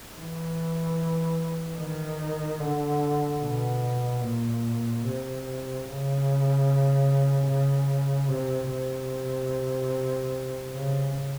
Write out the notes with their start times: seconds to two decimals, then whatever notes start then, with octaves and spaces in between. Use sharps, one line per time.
0.15 E3
1.78 D#3
2.60 D3
3.40 B2
4.21 A#2
5.04 C3
5.85 C#3
7.47 C#3
8.28 C3
8.70 C3
10.72 C#3